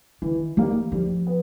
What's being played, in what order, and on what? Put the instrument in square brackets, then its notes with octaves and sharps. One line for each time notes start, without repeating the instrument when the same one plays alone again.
[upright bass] D#3 [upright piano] E3
[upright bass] E3 [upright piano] G3 A#3 D#4
[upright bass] F3 [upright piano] G3
[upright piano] B3